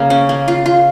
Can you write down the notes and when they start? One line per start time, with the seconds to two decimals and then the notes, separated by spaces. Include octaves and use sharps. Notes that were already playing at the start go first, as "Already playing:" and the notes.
Already playing: C#3 A#3
0.10 C#4
0.29 A#3
0.48 F4
0.66 F4